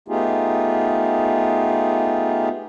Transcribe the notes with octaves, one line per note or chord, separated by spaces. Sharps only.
A3 B3 D#4 F4 G4 G#4